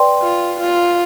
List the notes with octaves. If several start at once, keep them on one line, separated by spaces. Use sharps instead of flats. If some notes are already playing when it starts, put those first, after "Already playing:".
Already playing: B4 D5 G5 C6
F4
F4